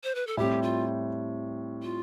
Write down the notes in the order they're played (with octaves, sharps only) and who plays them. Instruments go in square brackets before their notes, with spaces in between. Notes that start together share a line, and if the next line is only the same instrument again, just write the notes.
[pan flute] C5
B4
A4
[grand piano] A2 G3 C4 [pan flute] G4
[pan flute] F4
F4